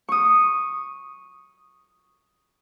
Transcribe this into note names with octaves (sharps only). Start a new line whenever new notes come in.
C#6 D#6